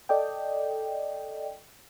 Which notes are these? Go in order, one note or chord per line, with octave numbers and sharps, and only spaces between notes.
A4 D5 D#5 G5